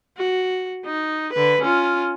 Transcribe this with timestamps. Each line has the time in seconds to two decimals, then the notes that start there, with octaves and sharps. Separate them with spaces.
0.17 F#4
0.86 D#4
1.33 D3 B4
1.62 C#4 F4